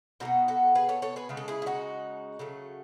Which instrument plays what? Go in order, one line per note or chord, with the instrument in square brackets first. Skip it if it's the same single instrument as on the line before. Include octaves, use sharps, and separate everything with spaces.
[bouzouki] B2 G#3 D#4 F#4
B3
F#4 A4
G#4 B4
A4 C#5
A4 C#5
G#4 B4
C#3 G#3 B3
A4
E4 G#4
E4
D#4 F#4
C#3 F#3 A3